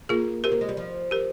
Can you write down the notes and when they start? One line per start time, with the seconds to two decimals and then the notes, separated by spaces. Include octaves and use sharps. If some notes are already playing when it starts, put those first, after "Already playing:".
0.09 A#3 F4 G#4
0.44 C4 G4 A#4
0.52 A#3
0.61 G#3
0.69 G3
0.77 F3
1.11 G4 A#4